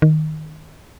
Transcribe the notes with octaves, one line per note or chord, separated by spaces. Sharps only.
D#3